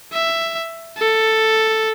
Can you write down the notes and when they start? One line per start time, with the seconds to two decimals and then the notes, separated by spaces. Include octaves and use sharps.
0.13 E5
0.98 A4